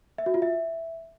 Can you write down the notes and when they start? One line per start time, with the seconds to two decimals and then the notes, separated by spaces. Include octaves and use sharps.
0.18 E5
0.26 F#4
0.34 F4
0.42 E5